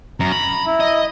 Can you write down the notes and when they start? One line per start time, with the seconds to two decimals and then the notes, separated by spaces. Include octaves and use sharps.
0.20 F#2 A#5
0.32 B5
0.66 E4
0.80 D#5